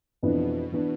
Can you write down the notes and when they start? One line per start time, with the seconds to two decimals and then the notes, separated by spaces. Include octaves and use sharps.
0.22 F2 B2 E3 B3 D4
0.72 E3 B3 D4